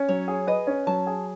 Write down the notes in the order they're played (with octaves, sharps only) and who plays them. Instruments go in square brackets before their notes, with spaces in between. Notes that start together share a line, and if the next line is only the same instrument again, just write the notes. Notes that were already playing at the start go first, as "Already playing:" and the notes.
Already playing: [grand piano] C#4
[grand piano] F#3 [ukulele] C#5
[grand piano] G#4
[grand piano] B4 [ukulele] D#5
[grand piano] C#4
[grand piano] F#3 [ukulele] A5
[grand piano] G#4